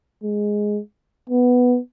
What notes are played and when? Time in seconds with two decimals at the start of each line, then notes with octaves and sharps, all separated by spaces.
0.23 G#3
1.29 B3